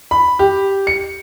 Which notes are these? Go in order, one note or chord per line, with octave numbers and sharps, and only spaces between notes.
B5
G4
C#7